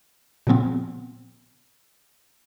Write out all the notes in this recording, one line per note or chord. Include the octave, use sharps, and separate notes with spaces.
A#2 C#3 F3 B3 C4